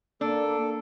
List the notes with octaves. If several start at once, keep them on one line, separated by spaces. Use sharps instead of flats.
A#3 D4 A4